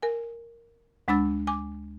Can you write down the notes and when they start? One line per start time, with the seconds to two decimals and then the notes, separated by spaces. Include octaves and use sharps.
0.02 A#4 G#5
1.08 D2 G#3 D4 B5 E6 A6
1.47 G#5 D6